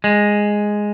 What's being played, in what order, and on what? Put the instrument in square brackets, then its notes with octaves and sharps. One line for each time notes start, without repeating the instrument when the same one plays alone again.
[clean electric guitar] G#3